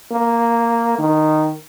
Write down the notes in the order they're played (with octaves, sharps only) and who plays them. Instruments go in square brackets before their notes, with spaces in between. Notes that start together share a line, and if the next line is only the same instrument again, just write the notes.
[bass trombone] A#3
D#3